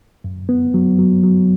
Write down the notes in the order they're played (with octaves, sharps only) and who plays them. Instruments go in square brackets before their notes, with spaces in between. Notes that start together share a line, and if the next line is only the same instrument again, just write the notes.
[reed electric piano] F#2
B3
F#3
F#3
F#3